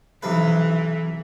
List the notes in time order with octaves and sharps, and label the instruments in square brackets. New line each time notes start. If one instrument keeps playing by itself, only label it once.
[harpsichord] B1 C3 B4 [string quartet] E3